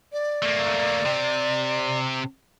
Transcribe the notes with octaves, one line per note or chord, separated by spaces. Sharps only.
D5
A3 A#3
C3